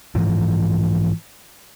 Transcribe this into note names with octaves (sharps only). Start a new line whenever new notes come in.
G#2 E3 F3